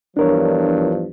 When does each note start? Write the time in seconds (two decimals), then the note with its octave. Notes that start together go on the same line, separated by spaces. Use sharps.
0.17 E2 G2 F3 D4 A#4 C#5